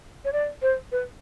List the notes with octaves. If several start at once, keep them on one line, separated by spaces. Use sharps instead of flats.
C#5
D5
C5
B4